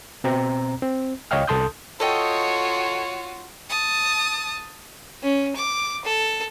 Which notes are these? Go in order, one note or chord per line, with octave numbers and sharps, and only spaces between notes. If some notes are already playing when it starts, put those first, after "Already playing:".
B2 C4 A#5
C4
C#2 C#5 D#5 F5 G5 F6
C2 A4 A5 C6 D#6 G6
F4 F#4 A4 C#5 D#5 G5
A5 D#6
C#4
D6
A4